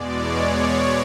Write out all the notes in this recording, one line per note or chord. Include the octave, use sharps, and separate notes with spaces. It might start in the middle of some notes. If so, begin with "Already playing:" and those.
Already playing: E2 B2 G#3 D5
C#5